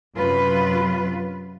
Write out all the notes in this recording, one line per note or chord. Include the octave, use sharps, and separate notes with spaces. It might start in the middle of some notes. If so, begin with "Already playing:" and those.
F#2 C3 F#3 F4 B4